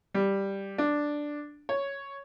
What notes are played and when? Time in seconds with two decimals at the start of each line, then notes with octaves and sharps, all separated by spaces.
0.14 G3
0.78 D4
1.69 C#5